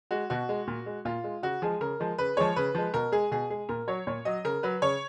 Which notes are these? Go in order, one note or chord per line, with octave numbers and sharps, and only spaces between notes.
G#3 F#4
B2 F#4
G#3
A#2
G#3
A#2 F4
G#3
C#3 F#4
F3 G#3 G#4
C#3 A#4
F3 G#3
C#3 B4
F3 G#3 C#5
C#3 B4
F3 G#3
B2 A#4
G#3 G#4
B2 G#4
G#3 G#4
A#2 A#4
F#3 C#5
A#2 C#5
F#3 D#5
C#3 A#4
F#3 B4
C#3 C#5